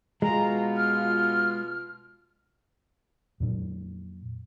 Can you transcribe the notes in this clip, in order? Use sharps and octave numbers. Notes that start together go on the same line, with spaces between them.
B2 G#3 F4 A#5
F6
F2 A#2 F#3